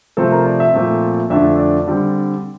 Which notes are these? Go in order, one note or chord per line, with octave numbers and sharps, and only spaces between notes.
C3 F3 A3 C4 A4
A#4
D5
E5
A#2 F3 A3 C4
F2 D3 A3 D4 E5
D5
D3 G3 C4